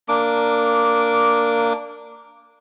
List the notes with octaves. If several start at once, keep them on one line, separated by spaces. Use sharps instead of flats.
A#3 D4 D6